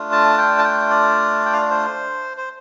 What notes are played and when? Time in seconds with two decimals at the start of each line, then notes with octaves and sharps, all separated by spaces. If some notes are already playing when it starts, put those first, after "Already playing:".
Already playing: A3 D4 F4
0.12 A5
0.38 G5
0.58 A5
0.64 G5
0.90 D5
1.45 G5
1.53 F5
1.62 D5
1.70 C5
2.37 C5